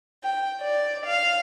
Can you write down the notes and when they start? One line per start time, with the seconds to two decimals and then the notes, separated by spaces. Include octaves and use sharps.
0.24 G5
0.60 D5
1.05 F5